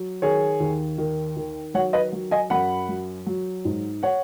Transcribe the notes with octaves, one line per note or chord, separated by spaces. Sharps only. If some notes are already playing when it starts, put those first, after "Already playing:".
Already playing: F#3
D#3 G#4 C#5
D#2
D#3
D#3
F#3 C#5 F#5
B4 D#5
F#3
D#5 G#5
F#2 F#5 B5
F#3
F#3
G#2
C#5 F#5